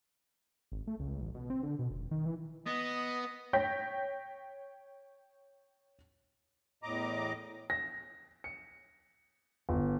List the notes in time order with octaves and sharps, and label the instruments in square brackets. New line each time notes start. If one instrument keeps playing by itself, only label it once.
[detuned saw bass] G#1
A3
C#2
A1
B2
C4
D3
B2
F1
D#3
E3
[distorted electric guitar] B3 [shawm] D#5
[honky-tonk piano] C#5 G5 G6 A#6 B6
[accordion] E2 A2 D#5 A#5 D6
[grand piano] A#6
C#7
G1